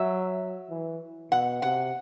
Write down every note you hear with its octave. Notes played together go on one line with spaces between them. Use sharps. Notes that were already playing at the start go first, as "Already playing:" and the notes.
Already playing: F#3 E5
E3
B2 F#5
C3 F#5